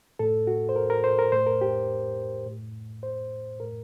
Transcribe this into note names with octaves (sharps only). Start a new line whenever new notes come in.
A2 A4
F#4
C5
A#4
A#4
C5
A#4
A2 C5
A#4
G4
A2
C5
A2 A#4